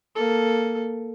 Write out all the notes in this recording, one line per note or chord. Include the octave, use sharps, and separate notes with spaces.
A#3 A4